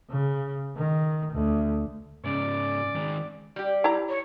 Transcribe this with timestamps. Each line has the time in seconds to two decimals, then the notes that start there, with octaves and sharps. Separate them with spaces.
0.10 C#3
0.77 D#3
1.33 D2
2.24 G#2 C#3 C#4 D5
2.95 D#3 G#3
3.56 G3 G4
3.84 E4 A#5
4.09 C#5